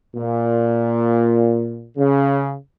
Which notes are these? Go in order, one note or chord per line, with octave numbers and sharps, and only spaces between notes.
A#2
C#3